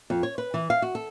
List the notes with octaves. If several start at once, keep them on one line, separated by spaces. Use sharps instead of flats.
F2
C#5
B4
E3
F5
F#4
A4